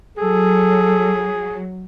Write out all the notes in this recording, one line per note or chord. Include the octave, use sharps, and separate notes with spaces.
F#3 G#4 A4